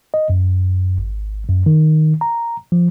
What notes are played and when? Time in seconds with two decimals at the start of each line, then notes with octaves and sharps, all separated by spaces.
0.14 D#5
0.30 F#2
0.98 G#1
1.48 F#2
1.66 D#3
2.21 A#5
2.72 F3